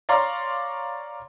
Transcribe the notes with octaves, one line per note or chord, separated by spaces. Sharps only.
C#5 D5 F5 A#5 C6